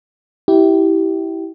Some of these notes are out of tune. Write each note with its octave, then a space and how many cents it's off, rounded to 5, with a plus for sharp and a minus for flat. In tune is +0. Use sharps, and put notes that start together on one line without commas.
E4 -15 G4 -15